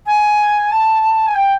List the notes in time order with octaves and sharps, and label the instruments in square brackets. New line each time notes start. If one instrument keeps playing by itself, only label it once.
[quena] G#5
A5
G#5
G5